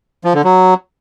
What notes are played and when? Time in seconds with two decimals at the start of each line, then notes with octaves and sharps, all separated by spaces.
0.24 F3
0.34 D3
0.44 F#3